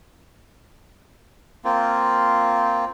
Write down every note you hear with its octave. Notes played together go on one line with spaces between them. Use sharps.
A#3 C4 F4